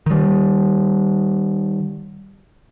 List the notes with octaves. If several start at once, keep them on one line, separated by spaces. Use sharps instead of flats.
D#3 G3